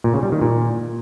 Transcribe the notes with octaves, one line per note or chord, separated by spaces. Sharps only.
A#2
C#3
G3
D#3
A#2